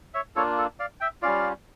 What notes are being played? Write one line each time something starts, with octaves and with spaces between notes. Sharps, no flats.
C#5 E5
A#3 D4 F4 A4 C#5
A4
D5 F5
E5 G5
G3 C#4 F4 D5 F5